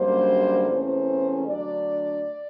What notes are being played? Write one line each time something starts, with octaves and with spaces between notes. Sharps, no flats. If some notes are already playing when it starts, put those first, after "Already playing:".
Already playing: F#2 D3 G3 A#3 C5
E2 C3 E3 A3 C#4 C5
D3 F#3 A3 D4 D5